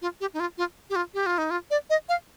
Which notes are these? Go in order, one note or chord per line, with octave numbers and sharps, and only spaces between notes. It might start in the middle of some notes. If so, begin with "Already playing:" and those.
F4
G4
D#4
F4
F4
G4
F4
G4
F4
D#4
F4
D5
D#5
F5